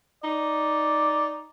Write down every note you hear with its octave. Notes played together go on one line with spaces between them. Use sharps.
D#4 D5